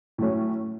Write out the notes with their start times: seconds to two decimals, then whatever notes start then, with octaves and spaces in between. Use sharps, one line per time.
0.18 A2 F#3 A3 C#4